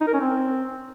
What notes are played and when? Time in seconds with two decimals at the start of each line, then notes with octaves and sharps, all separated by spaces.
0.01 D#4
0.07 A#4
0.14 C#4
0.20 C4